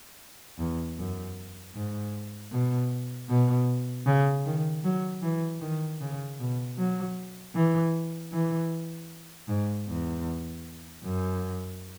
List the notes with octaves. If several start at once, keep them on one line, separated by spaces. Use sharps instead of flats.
E2
F#2
G#2
B2
B2
C#3
D#3
F#3
E3
D#3
C#3
B2
F#3
E3
E3
G#2
E2
F#2